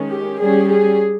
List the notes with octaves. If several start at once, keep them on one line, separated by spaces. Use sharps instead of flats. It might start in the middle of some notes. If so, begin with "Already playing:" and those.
Already playing: D#3 G#3 C#4
G4
G3 C#4 G#4
G#4